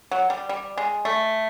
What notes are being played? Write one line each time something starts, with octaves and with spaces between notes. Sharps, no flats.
F#3
G3
G3
G#3
A3